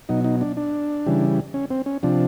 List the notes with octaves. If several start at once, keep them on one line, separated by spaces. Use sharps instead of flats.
B2 F#3 D#4
D#4
D4
D4
C#3 E3 G3
C#4
C4
C#4
C3 F3 D4